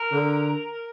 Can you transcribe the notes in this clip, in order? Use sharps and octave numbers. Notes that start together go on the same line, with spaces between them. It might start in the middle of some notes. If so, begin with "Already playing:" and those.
Already playing: A#4
D3